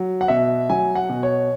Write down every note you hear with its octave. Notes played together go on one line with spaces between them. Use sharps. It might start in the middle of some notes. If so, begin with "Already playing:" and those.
Already playing: F#3
F#5
B2 E5
F#3 G#5
F#5
B2
C#5